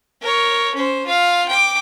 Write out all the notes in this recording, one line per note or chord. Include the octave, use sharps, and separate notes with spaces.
A#4 C#5
C#4 C5
F4 F5
G5 D6